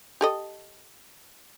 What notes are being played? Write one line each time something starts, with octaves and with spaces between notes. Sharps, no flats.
G4 A4 D#5